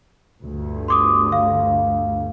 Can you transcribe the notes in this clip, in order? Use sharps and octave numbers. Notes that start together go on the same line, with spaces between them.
G1 D2 G2
C6 D6 D#6
F5